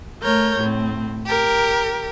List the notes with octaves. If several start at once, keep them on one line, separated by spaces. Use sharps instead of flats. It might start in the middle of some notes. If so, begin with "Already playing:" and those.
A3 A#4 C#5 G6
A2 C4
G4 A#4